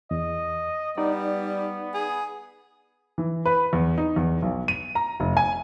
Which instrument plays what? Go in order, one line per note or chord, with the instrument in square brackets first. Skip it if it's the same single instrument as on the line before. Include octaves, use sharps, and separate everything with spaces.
[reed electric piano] E2 [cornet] D#5
[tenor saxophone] G3 [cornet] B3 [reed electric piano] D#4 D5
[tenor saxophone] G#4
[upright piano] E3
B4
E2
D#4
E2
B1
D#7
A#5
F1
G#5